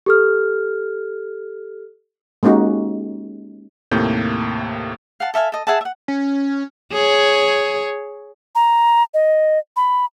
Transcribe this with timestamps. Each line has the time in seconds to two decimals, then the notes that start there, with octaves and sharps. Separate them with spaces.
0.06 G4 A4 F6
2.43 G#3 A#3 C#4 D#4 F#4 G4
3.91 D#2 A2 C3 A#3 G6
5.20 F5 F#5 A5
5.34 A4 E5 F5 G#5
5.52 A4 D#5
5.67 G#4 E5 F#5 A5
5.81 E5 F#5
6.08 C#4
6.93 G#4 C#5
8.55 A#5
9.14 D#5
9.76 B5